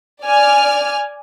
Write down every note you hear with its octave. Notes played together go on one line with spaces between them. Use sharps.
D5 G#5 F6